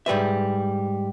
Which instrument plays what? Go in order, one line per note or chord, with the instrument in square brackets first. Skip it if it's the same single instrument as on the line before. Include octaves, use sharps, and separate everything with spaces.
[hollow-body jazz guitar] G#2 G3 B4 E5